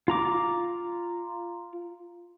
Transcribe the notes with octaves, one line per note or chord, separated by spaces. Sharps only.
F4 A#5 D6